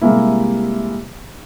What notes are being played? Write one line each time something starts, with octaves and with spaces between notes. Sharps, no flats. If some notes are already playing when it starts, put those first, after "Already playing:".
C3 G3 G#3 A#3 E4